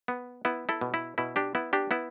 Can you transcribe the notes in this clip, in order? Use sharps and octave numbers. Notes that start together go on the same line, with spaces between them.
B3
B3 E4
E4 A4
B2
E4
B2 E4
D4 G4
B3 E4
D4 G4
B3 E4